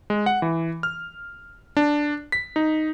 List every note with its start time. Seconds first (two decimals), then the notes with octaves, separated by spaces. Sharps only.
0.10 G#3
0.26 F#5
0.42 E3
0.83 F6
1.77 D4
2.32 B6
2.56 D#4